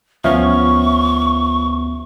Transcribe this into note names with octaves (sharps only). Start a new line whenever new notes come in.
D2 F3 B3 C#4 E5 C#6